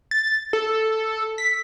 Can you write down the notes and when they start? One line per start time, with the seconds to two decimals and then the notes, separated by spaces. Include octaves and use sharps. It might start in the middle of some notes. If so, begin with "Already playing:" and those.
0.11 A6
0.53 A4
1.38 B6